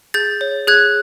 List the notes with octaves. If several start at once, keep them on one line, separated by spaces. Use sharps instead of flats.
G#4 G6 A6
C#5
G#4 F#6 G#6